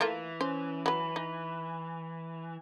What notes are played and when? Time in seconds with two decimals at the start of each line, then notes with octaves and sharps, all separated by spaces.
0.01 E3 A3 A#3 F4
0.41 C#4 C5
0.86 F#3 B4 B5
1.16 D#4